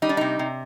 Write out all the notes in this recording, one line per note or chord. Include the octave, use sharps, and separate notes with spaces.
G3 D#4
D4
C3 D#4
C3